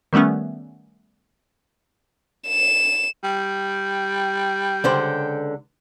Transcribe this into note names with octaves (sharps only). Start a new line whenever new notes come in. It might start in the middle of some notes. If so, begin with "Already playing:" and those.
D#3 G3 A3 B3 C#4
E7
G3 G5
C#2 D3 C5